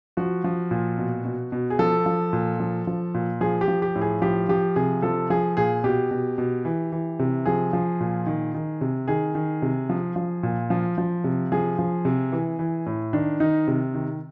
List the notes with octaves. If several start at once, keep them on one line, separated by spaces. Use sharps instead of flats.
F3 F#4
F3
A#2
B2
B2
B2
G#4
F3 A4
F3
A#2
F3
F3
A#2
F3 G#4
G4
F3
G4
A2
G#4
F3 G4
F3 G4
C3 G#4
F3 A4
F3 G#4
A#2 G#4
B2 G4
B2
B2
E3
E3
C3
F3 G#4
F3
A#2
D#3
D#3
C3
D#3 G#4
D#3
C3
F3
F3
A#2
F3
F3
C3
F3 G#4
F3
C3
E3
E3
A2
D#3 D4
D#3 D#4
C3
D#3